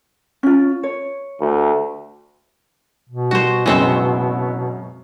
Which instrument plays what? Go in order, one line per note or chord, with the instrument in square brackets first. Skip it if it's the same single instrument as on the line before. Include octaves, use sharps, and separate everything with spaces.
[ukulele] C#4 F4
C#5
[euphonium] D2
[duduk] B2
[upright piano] G3 [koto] F#4 C5
[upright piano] F#2 C#3 C#6 [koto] G#3 C4 C5 [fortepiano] B3 E4